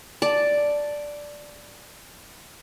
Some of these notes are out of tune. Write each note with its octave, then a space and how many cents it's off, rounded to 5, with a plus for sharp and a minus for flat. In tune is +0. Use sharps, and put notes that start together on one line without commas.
D5 +0 A5 +0